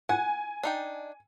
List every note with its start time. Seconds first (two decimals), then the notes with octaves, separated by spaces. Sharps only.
0.09 F#5 G#5
0.63 D4 D#4 G5